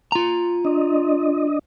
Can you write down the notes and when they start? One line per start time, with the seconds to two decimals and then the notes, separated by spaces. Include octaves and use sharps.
0.12 F4 A#5
0.65 D4 D#5